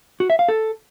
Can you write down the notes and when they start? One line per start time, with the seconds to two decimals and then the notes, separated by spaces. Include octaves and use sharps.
0.20 F#4
0.30 E5
0.39 F5
0.48 A4